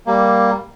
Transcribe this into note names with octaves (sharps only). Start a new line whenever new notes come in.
G3 A#3